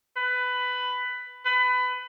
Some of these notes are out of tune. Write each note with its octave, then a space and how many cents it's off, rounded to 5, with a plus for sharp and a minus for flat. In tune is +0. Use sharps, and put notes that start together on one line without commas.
B4 +15
B4 +25